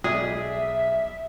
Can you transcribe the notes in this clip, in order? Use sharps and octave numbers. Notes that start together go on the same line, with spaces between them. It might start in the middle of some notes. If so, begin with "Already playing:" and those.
B1 G#4 D5 E5